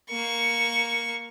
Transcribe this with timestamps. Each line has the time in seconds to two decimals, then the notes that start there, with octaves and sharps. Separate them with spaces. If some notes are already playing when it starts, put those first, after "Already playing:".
0.10 A#3 C#6